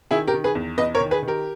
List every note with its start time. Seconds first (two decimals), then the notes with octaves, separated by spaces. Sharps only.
0.11 D#3 E4 G#4
0.27 G4 A#4
0.33 D#3
0.44 G#4 B4
0.55 E2
0.78 E2 B4 D#5
0.95 A#4 C#5
1.00 D#3
1.11 G#4 B4
1.22 D#3
1.28 G4 A#4